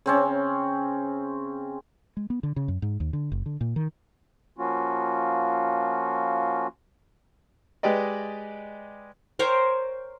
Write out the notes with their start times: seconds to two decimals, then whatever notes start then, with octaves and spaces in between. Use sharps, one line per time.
0.06 C#3 C4 C#4
2.17 G#3
2.30 B3
2.43 D3
2.56 C#3
2.68 F#2
2.82 G#2
3.00 D#2
3.13 D3
3.32 F#1
3.46 D3
3.61 A#2
3.76 D#3
4.58 F3 A#3 C#4 F4 F#4
7.83 G#3 G4 B4 D5 D#5
9.39 A#4 C5 C#5 G5